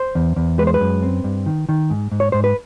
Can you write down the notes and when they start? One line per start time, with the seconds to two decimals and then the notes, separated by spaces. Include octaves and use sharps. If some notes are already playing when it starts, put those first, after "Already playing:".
Already playing: C5
0.15 E2
0.36 E2
0.59 G#3 B4
0.67 C5
0.74 B4
0.81 F#2
1.03 C4
1.24 G2
1.46 D#3
1.69 D#3
1.90 G#2
2.12 G#2
2.20 C#5
2.32 G#2 C5
2.44 B4